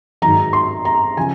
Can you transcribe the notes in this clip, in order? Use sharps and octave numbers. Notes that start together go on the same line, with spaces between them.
G#2 D#3 F#3 A#5
C6
A#5
C#3 F3 G#5